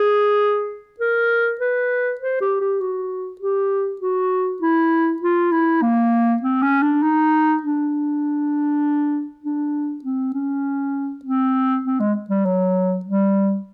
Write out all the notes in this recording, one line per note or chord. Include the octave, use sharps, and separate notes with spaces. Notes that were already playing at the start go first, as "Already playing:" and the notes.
Already playing: G#4
A#4
B4
C5
G4
G4
F#4
G4
F#4
E4
F4
E4
A#3
C4
C#4
D4
D#4
D4
D4
C4
C#4
C4
C4
G#3
G3
F#3
G3